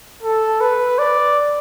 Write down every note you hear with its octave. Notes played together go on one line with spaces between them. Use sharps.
A4
B4
D5